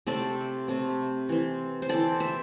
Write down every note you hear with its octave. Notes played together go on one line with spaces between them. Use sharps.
C3 A3 C4 A4 D5
C3 A3 C4
E3 C4
C5
E3 C4 A4 D5
C5 E5